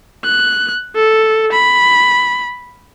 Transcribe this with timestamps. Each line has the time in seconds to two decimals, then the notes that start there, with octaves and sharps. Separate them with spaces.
0.24 F#6
0.95 A4
1.53 B5